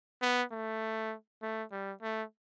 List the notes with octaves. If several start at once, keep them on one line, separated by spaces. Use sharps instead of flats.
B3
A3
A3
G3
A3